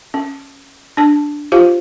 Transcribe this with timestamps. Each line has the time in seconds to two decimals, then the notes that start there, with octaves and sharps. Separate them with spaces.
0.14 C#4
0.97 D4 A5
1.52 F4 G4 C5 F5